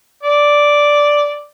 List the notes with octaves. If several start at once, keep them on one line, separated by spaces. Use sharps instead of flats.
D5